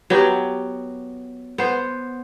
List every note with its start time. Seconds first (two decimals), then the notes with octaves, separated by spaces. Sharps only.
0.10 F#3 B3 G4
1.58 B3 C5